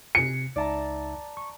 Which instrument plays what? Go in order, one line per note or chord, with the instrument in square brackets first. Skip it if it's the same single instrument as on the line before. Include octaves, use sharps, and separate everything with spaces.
[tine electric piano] C3 C7 [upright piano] C#7
[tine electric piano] C#2 D#4 E5 [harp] D5 A5 A#5
[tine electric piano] C#6